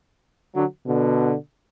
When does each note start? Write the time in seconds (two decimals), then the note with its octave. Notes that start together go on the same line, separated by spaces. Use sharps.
0.55 D3 F#3
0.87 B2 D3